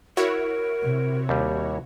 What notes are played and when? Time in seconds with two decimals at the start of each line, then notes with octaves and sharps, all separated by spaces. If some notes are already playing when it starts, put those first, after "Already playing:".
0.17 E4 F#4 A#4 C#5
0.82 C3
1.29 D#2 G3